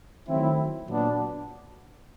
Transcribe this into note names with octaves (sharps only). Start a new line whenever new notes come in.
D#3 F#3 A3 C4 E4
A#2 F#3 B3 D4